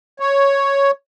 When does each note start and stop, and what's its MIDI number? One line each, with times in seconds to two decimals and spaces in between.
0.20 0.91 73